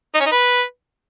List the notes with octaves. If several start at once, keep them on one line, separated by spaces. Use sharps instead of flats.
D#4
C#4
D#4
B4